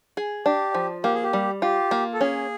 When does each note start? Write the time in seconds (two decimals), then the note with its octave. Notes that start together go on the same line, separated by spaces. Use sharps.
0.17 G#4
0.46 D4 G4
0.74 F3
1.04 A#3 G4
1.14 G#4
1.23 G4
1.33 G3
1.62 F4 G4
1.91 A#3
2.13 A4
2.21 C#4 G#4